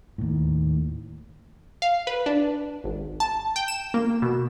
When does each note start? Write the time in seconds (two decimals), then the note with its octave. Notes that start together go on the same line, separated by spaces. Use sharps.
0.18 D#2 A2
1.82 F5
2.07 B4
2.26 D4
2.84 G#1
3.20 A5
3.56 G5
3.68 E7
3.94 A#3
4.22 B2